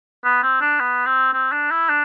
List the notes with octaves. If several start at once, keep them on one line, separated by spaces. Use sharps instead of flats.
B3
C4
D4
B3
C4
C4
D4
E4
D4